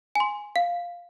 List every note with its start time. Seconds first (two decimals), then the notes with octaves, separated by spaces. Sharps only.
0.15 G#5 C6
0.56 F5